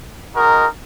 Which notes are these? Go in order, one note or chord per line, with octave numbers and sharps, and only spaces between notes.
G#3 D#4 F#4 A#4